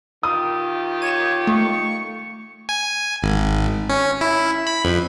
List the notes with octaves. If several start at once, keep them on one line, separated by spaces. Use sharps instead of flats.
D#3 F4 G4 D#6
C#5 D#7 E7
A3 C#6
G#5
G#1
C#4
E4
B5
F2